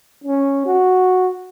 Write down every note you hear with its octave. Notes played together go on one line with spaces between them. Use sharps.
C#4
F#4